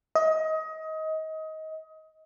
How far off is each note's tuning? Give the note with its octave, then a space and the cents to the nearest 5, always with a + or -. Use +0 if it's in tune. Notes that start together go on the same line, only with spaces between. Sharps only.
D#5 +25